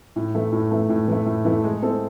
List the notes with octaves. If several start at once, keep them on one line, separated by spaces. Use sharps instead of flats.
A2
E3 A3
A2
E3 A3
A2
E3 A3
A2
E3 A3
G#3
C4 E4 A4